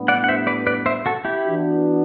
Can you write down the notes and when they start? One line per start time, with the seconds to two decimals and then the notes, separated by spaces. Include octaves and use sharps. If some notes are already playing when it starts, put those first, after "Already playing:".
Already playing: A2 G3 B3 D4
0.08 D5 F#5
0.24 F#5
0.28 C5 E5
0.47 B4 D5
0.67 B4 D5
0.86 C5 E5
1.06 F#4 A4
1.25 E4 G4
1.45 E3 B3 D4 F#4